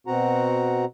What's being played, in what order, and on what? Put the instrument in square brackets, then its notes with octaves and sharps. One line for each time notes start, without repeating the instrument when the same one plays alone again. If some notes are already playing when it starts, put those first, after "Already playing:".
[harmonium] B2 C4 F#4 F#5 A#5